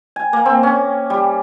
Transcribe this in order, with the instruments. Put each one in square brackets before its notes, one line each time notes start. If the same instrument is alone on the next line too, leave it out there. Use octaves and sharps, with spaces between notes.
[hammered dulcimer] G#5
A#3
C4
C#4
G3